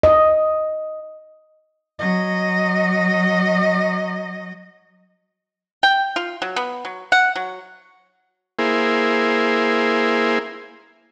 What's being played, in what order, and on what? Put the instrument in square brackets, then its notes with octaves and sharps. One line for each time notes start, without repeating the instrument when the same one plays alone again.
[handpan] D#5
[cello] F#3 D#5
[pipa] G5
F4
F#3
B3
F#3
F#5
F#3
[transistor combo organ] A#3 E4 G#4 C5